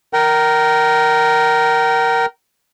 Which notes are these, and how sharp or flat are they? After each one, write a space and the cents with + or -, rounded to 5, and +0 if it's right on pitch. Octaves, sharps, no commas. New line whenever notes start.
A#4 +0 G5 -35